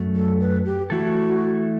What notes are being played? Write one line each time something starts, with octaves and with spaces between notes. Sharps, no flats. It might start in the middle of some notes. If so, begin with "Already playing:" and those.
Already playing: F#2 F#3 A3
A4
B4
G4
E3 A3 E4 F#4 A4